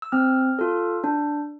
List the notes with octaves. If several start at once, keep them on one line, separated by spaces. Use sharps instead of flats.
E6
C4 F6
F4 A4
D4